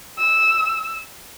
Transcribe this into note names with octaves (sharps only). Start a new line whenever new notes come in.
E6